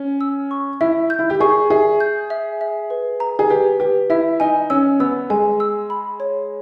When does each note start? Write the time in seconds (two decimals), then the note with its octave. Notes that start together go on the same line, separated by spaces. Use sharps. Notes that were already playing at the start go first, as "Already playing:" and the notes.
Already playing: C#4
0.21 E6
0.51 C#6
0.81 E4 E5
1.10 G6
1.19 E4
1.30 G4
1.40 G#4 C#6
1.70 G#4 E5
2.00 G6
2.30 E5
2.61 E5
2.90 B4
3.20 A#5
3.39 G#4
3.50 G4 B4
3.80 G4 B4
4.10 E4 E5
4.40 D#4 G#5
4.70 C#4 E6
5.00 B3 E6
5.30 G#3 G#5
5.60 E6
5.90 B5
6.20 C#5